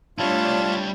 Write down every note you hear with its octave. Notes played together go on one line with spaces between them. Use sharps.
G3 A3 D4 E4 F4 C#5 A5